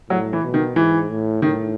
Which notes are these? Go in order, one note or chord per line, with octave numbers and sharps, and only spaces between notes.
A2 F#3
E3
B2
D#3
G#2 E3
A2
A2 D#3